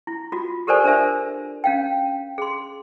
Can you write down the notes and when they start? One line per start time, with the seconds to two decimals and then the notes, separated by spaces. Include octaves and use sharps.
0.07 E4
0.32 F4 F#4
0.67 G4 A4 A#4 C5 D5 G#5
0.84 D4 A#4 C5 E5 G#5
1.64 C#4 F5 G5
2.38 G#4 C6